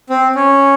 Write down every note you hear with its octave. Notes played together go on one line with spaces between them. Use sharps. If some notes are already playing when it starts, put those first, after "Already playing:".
C4
C#4